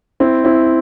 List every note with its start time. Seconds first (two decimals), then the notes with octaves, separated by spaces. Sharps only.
0.20 C4 E4
0.44 C4 E4